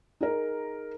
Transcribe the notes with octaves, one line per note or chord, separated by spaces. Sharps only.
D#4 G#4 A#4